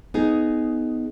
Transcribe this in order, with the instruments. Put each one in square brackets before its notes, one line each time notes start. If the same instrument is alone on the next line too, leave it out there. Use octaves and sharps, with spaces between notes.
[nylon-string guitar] B3 D#4 G#4